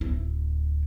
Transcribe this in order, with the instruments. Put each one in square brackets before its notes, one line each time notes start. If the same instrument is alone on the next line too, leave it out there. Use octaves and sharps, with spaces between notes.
[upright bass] D1 E4